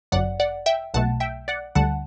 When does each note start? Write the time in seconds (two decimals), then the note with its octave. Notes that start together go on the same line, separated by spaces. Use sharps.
0.12 G1 F#2 F#3 D5 F#5
0.40 D5 F#5
0.66 E5 G5
0.94 B1 B2 A3 F#5 A5
1.20 E5 G5
1.48 D5 F#5
1.75 D2 D3 G3 F#5 A5